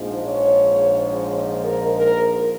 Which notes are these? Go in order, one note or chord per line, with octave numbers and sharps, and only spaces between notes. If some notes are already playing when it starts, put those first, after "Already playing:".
Already playing: A#1 G#2 F3 G#3
C#5
A#4
A#4